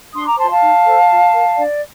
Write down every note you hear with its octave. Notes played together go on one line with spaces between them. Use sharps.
D4 C6 D#6
A#5 D6
F4 C5 A5 C6
F5 A5
D#4
A4 C5
F4
A#4
D4 D5